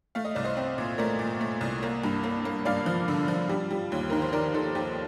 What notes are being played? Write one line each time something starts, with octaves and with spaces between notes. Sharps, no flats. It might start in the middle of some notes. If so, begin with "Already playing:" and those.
A3 F5
D#5
C2 D5
C5 D#5
C4
A#2
A3 A#4 D5
A#2
A3
C2
A#3
G2
A#3
A#3
G2 D5 F5
F3
D3
F3
G3
G3
D#2
D#3 A#4
C5
D#3 A#4 D5
D#3 A4
D#2 G4